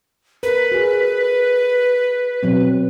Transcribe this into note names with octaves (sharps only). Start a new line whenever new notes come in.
A#4 B4
F#4 G#4
B2 F#3 C4